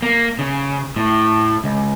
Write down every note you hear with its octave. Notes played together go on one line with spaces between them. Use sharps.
A#3
C#3
A2
C#2